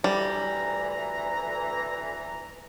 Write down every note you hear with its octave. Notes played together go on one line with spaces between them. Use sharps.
D2 E3 G3 A#5